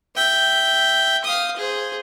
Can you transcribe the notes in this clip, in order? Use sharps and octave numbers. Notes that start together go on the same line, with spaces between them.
E5 G5
F5 D#6
G#4 C5